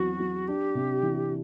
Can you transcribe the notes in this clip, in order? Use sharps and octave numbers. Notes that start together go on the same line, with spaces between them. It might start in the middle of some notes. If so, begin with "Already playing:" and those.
Already playing: E2 F#3 C4 F#4
F#3
D4 G4
C3
E3